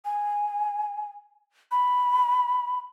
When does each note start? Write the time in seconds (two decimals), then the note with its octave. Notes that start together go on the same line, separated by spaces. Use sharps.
0.05 G#5
1.71 B5